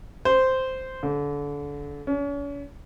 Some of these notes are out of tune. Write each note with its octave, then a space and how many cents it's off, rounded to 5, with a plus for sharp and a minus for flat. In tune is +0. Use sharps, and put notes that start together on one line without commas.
C5 -5
D3 -30
C#4 +40